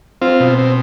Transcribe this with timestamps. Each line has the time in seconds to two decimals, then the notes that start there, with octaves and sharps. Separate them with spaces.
0.22 C4 F4
0.40 B2
0.59 C4